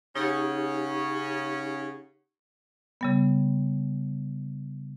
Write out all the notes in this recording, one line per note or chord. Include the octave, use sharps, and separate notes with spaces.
C#3 C#4 D#4 G4 F#5
C#3 G3 B3